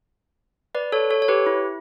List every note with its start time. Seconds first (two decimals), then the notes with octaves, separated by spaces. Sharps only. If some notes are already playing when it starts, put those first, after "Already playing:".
0.75 B4 D5
0.92 A4 C#5
1.11 A4 C#5
1.22 C#5
1.28 G4 B4
1.46 E4